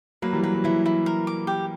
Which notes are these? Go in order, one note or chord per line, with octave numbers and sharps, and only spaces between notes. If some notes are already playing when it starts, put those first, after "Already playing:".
F#3 A#3 B4
E3 G3
F#3 B4
F#3
E3 E4
E4
A#4
D6
G4